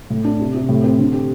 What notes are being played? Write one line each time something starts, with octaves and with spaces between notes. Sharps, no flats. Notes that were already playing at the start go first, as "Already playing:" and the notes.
A2
D4
C3
C3
A2
C4
D3
G4